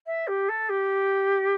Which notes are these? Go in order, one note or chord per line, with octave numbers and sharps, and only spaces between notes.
E5
G4
A4
G4